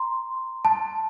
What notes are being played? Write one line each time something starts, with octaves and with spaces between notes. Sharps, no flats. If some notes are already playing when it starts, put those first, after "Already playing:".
Already playing: A#5 C6
A5